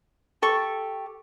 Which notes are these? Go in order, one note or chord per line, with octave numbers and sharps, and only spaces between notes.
G4 A4 C#6